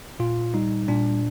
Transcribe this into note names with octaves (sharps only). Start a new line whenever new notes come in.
A#2 F4
G3 D#4
A#2 D4